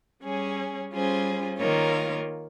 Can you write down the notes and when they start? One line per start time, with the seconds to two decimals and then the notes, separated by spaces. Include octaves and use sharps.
0.23 G3 C#4 G#4 C#5
0.92 G3 C#4 F4 G#4 C5
1.58 D#3 A#3 F4 A#4 C#5